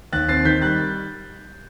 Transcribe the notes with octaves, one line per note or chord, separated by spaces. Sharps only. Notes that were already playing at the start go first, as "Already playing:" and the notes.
D#2 F#6 A6
C4 A6 C7
D#3 G6 B6
G3 F#6 A6